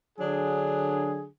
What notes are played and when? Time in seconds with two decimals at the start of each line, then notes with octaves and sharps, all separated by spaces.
0.18 D3 F#3 D4 G#4